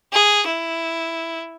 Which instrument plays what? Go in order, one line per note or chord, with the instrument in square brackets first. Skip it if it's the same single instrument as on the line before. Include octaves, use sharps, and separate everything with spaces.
[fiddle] G#4
E4